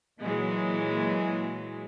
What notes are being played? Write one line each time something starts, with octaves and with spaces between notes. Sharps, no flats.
A#2 E3 F#3 G#3